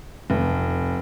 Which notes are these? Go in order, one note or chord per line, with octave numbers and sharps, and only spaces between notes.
F1